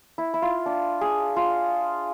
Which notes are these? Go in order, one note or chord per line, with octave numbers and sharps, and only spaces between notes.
E4
E4
F4
D4
G#4
F4